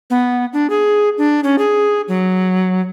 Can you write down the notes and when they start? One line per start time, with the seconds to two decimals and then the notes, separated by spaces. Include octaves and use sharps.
0.10 B3
0.53 D4
0.70 G#4
1.18 D4
1.44 C#4
1.58 G#4
2.08 F#3